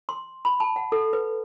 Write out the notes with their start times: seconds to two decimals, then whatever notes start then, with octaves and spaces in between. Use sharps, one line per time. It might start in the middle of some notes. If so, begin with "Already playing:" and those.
0.09 C6
0.45 B5
0.60 A5
0.76 F#5
0.92 A4
1.13 B4